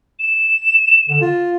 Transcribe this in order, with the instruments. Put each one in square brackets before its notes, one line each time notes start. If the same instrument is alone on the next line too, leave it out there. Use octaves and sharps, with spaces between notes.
[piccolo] E7
[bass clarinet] D3
F4